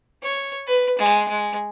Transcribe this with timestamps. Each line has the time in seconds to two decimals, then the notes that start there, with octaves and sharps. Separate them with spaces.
0.23 C#5
0.67 B4
0.98 G#3
1.28 G#3